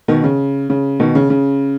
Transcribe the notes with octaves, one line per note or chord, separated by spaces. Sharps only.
B2 D#3
C#3
C#3
B2 D#3
C#3
C#3